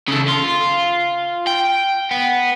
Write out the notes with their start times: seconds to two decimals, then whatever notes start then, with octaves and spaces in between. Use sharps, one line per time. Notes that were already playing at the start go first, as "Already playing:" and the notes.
0.08 C#3 A4
0.28 F4
1.47 G5
2.11 B3